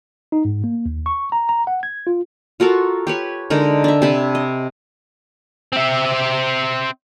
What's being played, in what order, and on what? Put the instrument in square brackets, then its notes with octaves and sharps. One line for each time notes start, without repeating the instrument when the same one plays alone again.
[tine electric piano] D#4
G#2
A#3
D#2
C#6
A#5
A#5
F#5
G#6
F4
[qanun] F4 F#4 A4 A#4
G4 B4 C#5
D3 G#3 D#4 A#4
D4 E5
C3 G#5 A5 B5
D#5
[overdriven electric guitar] C4 E5